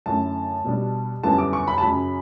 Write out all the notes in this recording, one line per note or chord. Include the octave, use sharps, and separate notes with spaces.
F#2 D3 A3 E4 A5
B2 G3 D4
F#2 D3 G3 B3 E4 A5
D6
C#6
B5
A5
F#2 C#3 F#3 B5